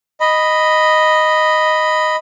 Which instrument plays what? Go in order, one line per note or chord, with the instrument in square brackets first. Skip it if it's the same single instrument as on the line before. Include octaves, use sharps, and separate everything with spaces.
[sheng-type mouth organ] D#5 B5